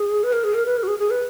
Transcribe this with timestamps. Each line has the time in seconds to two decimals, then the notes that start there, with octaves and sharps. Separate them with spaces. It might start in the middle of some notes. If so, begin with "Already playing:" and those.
Already playing: G#4
0.23 B4
0.33 A#4
0.44 G#4
0.54 A#4
0.66 B4
0.77 A#4
0.83 F#4
0.88 G#4
0.99 G#4
1.10 B4